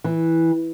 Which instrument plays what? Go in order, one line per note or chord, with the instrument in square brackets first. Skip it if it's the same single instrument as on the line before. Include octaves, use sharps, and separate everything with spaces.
[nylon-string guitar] E3